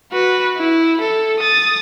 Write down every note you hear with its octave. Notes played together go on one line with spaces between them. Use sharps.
F#4 B4
E4
A4
D#6 A6